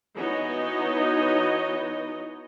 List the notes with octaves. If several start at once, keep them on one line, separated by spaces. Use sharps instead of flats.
E3 B3 D#4 F#4 C#5 D#5